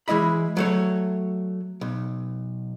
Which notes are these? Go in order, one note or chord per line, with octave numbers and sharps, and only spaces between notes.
E3 G#3 E4 D#5 B5
F#3 A3 C#5
B1